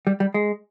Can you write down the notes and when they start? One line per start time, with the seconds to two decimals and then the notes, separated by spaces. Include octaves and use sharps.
0.07 G3
0.20 G3
0.34 G#3